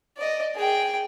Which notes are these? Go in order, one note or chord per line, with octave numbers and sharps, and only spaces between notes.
D5 D#5
G#4 G5